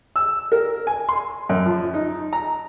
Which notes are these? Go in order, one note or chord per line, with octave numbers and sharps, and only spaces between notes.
E6
A#4
G#5
C6
F#2
F3
D#4
A#5